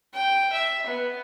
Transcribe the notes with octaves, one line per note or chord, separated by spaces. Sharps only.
G5
E5
B3